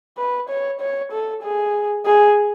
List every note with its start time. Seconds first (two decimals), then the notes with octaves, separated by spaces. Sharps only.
0.18 B4
0.49 C#5
0.80 C#5
1.12 A4
1.42 G#4
2.06 G#4